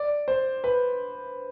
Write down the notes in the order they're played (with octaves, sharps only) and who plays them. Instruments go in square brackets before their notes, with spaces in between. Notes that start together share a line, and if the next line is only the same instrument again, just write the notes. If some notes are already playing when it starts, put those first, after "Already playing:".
Already playing: [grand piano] D5
C5
B4